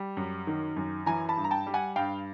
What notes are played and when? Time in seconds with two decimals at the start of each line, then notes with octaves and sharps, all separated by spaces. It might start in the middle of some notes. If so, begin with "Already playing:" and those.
Already playing: G3
0.17 F#2
0.47 D#3
0.76 F#2
1.06 E3 G#5 A#5
1.29 A5 B5
1.37 G2
1.44 A#5
1.51 G5 A5
1.67 G3
1.74 F#5 G#5
1.96 G2 F5 G5